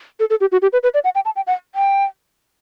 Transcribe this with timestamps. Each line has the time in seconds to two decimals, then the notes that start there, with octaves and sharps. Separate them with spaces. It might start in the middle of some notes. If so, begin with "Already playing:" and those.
0.20 A4
0.30 A4
0.41 G4
0.52 F#4
0.62 G4
0.73 B4
0.83 B4
0.94 D5
1.04 F#5
1.15 G5
1.25 A5
1.36 G5
1.47 F#5
1.75 G5